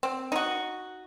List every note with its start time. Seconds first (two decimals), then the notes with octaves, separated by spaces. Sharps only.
0.03 C4
0.32 D#4 F#4